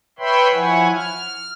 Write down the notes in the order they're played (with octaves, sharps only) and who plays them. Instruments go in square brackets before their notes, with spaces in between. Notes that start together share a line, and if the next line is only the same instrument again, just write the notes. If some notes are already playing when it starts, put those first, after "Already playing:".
[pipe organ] B4 C#5 E5 G5 B5 C6
F3 E4 C#5 F#5 G#5
F6